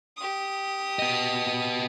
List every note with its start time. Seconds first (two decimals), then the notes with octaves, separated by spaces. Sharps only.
0.17 G4 D#6
0.99 B3 D#5